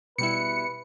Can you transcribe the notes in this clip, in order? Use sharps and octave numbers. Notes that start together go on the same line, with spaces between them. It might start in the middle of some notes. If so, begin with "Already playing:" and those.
B2 G3 E4 B4 C#7